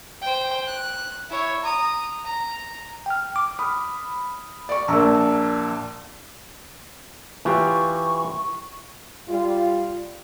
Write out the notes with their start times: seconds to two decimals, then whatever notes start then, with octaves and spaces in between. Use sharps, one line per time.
0.21 C5 G5
0.67 F#6
1.30 E4 C#5
1.63 A#5 D#6
2.25 A#5
3.06 G5 F6
3.36 D6
3.59 B5 D#6 F6
4.69 D5 C#6
4.88 A#1 A#2 A5 A#5 E6
7.45 E3 F4 G4 C#6
9.28 G3 F4